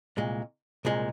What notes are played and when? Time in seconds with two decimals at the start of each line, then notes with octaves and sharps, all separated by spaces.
0.17 C2 A#2 G#3
0.85 C2 A#2 G#3